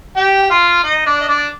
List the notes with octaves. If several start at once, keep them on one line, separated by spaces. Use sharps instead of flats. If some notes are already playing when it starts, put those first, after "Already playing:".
G4 G5
G5
F4 F5
D#4 D#5
D4 D5
D#5
D4 D5